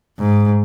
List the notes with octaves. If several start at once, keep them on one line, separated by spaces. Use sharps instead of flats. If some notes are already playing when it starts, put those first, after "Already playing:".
G#2